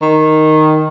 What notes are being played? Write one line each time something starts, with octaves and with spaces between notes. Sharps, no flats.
D#3